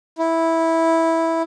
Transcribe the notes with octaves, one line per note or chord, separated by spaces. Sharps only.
E4